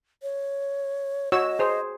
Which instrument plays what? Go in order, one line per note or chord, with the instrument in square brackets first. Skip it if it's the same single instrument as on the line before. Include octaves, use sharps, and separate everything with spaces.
[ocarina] C#5
[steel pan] F#4 C#5 E6 [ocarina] D#5
[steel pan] G#4 C5